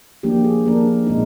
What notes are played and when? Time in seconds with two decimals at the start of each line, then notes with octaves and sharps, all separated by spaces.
0.23 F3 A#3 D4 G4
0.44 G#4
0.66 F3 A#3 D4 A#4
1.07 A#2 G#3 C4 D#4